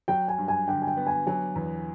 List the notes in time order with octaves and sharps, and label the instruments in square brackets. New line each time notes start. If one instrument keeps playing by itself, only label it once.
[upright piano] F#3 [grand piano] G5
[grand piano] G#5
[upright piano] G2
[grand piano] G#5
[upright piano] D3 [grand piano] G5
[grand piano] G#5
G5
[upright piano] B3
[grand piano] G#5
[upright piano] F#3 [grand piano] G#5
[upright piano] E2